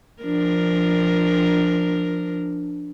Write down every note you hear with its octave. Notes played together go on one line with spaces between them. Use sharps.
F3 D4 A#4